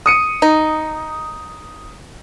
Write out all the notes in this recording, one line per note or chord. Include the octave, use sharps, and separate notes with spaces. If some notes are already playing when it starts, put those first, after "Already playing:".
D#6 C#7 D#7
D#4